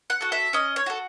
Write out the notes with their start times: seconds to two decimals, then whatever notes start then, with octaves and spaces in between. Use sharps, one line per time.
0.10 F#5
0.21 F#4 A4
0.32 E5
0.53 C#4 D#5
0.76 C#5
0.86 F#4 A4